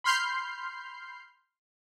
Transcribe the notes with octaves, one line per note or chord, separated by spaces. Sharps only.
B5 C6 F6 G6 C7